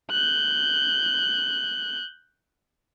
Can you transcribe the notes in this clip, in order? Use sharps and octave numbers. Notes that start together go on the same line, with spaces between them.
F#6 G6